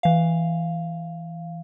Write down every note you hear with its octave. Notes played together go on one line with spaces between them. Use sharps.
E3 F5